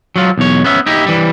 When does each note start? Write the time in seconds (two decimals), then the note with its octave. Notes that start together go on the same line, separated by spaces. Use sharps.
0.16 F#3 F4
0.38 B1 E2 C#5
0.64 B3 C#4 E5
0.86 D#4 E4 G4
1.06 E3 G3